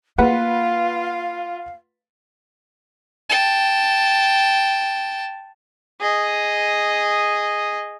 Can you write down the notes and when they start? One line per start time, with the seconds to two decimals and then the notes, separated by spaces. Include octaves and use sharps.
0.18 A#3 F4 B4 F5 F#5
3.30 G5 A5
6.00 G#4 D#5